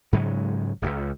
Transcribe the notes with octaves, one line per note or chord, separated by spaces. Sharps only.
G#2 C#3 F#3 G#3
D#1 C#2